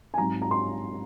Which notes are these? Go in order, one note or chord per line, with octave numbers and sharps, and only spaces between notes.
G#5
G#2 F#3 C4 D#4 A#5
A#5
C6